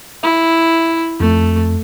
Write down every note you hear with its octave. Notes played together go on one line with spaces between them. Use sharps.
E4 E5
F2 A3